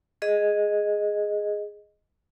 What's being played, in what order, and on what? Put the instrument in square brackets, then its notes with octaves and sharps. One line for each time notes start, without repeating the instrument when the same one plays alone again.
[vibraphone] G#4 D#5